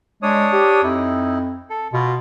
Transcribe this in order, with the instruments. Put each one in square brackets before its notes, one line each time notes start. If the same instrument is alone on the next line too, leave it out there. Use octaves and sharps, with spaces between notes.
[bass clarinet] G#3 [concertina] D4 C#5 D#6
[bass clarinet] G4
[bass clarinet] F2 [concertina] D#4 E4
[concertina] A4
[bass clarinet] B2 [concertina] F4